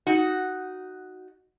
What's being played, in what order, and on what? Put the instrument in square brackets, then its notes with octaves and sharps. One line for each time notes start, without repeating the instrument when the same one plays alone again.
[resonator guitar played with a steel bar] D#4 F#4